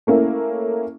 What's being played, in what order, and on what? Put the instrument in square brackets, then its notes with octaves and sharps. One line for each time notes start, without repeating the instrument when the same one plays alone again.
[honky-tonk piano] A3 A#3 C#4 E4